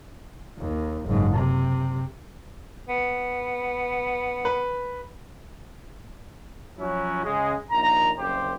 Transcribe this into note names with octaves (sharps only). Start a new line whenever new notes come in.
D#2
F#1 G#2
C3
B3
B4
F3 F#3 C#4 E4 F#4
C#3 G#3
A#1 D#2 A#5
F#1 C2 G4 C5